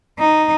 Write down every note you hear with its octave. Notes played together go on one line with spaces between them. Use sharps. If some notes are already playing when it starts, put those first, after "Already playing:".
D#4